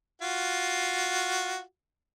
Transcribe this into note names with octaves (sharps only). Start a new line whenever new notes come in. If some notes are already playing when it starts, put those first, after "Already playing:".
F4 F#4